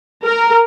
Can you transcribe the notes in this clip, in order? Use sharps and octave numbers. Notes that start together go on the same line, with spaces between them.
A#4